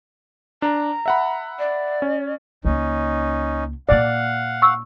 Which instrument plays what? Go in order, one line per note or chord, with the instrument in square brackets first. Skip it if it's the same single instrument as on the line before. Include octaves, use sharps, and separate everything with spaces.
[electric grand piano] D4 [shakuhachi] A#5
[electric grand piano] E5 F#5 B5
[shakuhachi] D5
[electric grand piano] C#4
[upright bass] C#2 A#3 [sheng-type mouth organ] C#4 D#4
[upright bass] A#2 A#3 [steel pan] D5 [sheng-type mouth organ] F5 F#5
[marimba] C#6 E6